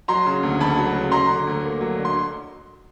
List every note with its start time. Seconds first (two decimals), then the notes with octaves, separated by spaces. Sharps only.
0.08 F#3 A#5 C6
0.26 C#3
0.43 D2
0.60 D2 A5 B5
0.78 F#3
0.95 C#3
1.11 F#3 A#5 C6
1.30 D3
1.47 D2
1.64 A#3
1.81 F#3
1.98 D3
2.05 C6